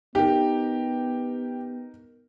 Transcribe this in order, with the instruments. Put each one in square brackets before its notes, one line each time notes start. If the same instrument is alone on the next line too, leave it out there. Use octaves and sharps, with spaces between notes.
[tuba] B3 [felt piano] D#4 A#4 [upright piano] G4